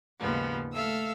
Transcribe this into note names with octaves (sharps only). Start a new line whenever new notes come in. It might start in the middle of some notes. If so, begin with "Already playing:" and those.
D#2 G#2 C#3 F3 G3 B3
A3 A4 E5 F5 E6